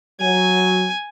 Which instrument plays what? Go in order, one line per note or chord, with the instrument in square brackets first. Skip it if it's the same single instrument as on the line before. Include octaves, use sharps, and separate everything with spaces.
[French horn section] F#3 [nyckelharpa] G#5